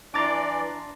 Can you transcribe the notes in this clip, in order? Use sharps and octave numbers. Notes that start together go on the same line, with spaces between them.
E3 D4 D5 A#5 C6 D6 A6